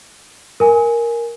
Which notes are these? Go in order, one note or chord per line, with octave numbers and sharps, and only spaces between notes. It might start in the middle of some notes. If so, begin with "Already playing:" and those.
A#4 G#5